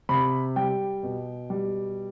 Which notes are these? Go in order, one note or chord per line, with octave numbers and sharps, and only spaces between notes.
C3 B5
G3 G5
B2
G3